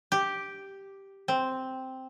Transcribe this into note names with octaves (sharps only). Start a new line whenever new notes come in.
G4
C4